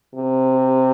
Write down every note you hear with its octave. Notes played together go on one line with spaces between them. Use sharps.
C3